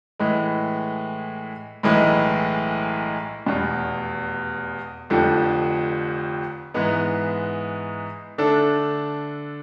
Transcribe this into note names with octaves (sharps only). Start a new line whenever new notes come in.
A2 E3 G#3
B1 A2 E3 G#3
F1 E2 B2
F1 F2 D3 F3
G#2 E3 G#3 B3
D3 A3 D4 A4